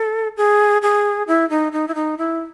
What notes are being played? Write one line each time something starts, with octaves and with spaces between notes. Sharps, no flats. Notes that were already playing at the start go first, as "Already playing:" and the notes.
Already playing: A4
G#4
G#4
E4
D#4
D#4
E4
D#4
E4